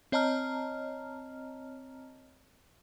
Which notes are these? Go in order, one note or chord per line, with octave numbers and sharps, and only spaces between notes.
C4 C#5 D#5 A5 A#5 F6